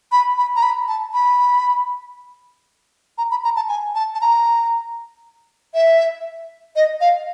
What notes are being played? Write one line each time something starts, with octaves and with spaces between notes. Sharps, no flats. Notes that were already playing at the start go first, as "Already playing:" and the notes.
B5
B5
A#5
B5
A5
B5
A#5
B5
A#5
A5
G#5
A5
A5
A#5
E5
D#5
F5